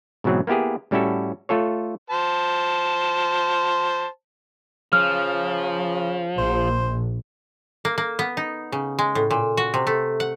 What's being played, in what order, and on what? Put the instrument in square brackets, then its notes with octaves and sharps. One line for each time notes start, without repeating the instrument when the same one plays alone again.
[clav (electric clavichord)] G#2 B2 E3 F#3 C4
A#3 B3 E4 G4 G#4
A2 G3 C#4 E4 F#4 A4
A3 F4 A4 C#5
[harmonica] C5 A5
[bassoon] C#3 [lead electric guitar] F3 [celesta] F6
[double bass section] A#1 [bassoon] C5
[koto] A#3
A#3
B3
D#4
C#3
G#3
A2
A#2
F#4
C3
A3
F#5